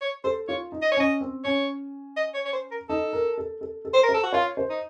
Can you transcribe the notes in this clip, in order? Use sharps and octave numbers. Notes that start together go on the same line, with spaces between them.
C#5
A4 C5
F4 C#5
D#4
D#5
C#5
C#4 D#5
C4
C#4 C#5
D#5
C#5
C#5
C5
A#4
D#4 A4
A#4
A4
A4
A4
C5
A#4
C5
A4
F#4
F4 C#5
C5
D#4